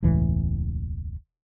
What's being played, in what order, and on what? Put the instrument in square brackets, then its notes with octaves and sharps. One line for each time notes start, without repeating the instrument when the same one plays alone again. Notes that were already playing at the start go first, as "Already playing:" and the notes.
[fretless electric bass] E1 C#2 A2 E3